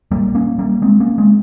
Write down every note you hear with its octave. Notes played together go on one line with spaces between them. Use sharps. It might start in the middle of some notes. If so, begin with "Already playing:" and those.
A#1 A#2 G3 A#3
A#3 C#4
G3 A#3
G#3 C4
A#3 C#4
G#3 C4